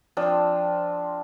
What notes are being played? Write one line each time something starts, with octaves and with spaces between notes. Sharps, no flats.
F3 C4 D4